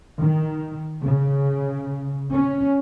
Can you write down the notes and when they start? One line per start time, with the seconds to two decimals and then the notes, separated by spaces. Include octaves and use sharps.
0.18 D#3
1.03 C#3
2.32 C#4